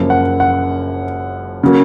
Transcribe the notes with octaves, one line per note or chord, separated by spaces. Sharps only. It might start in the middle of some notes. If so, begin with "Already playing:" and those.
Already playing: F#1 F#2 F3 A#3
F#5
F#5
C#3 F#3 A#3